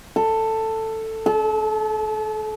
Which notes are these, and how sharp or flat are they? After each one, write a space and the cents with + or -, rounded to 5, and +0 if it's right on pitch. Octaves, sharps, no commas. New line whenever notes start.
A4 +10
A4 -35